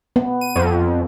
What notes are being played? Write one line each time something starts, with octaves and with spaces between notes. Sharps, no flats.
B3
D#7
F2